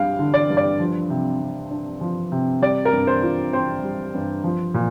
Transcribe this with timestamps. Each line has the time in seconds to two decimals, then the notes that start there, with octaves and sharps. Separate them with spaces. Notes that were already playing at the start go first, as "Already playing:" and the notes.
Already playing: G2 D3 G3 F5 G5
0.19 D3
0.34 D5
0.50 G2
0.57 D5
0.80 F3
1.10 C3
1.40 C3
1.70 D4
2.01 F3
2.32 C3
2.62 G3 D5
2.85 A#4
2.93 G2
3.07 C5
3.23 F4
3.53 C4 C5
3.83 G3
4.14 G2
4.44 F3
4.74 A#2